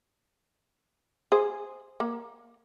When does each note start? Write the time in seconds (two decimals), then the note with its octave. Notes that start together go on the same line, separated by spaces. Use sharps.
1.32 G#4 C5
2.00 A#3